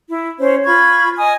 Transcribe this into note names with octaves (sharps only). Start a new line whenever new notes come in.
E4
C#4 C5 C#5
F4 B5 C#6 G#6
D#5 G#5 D#6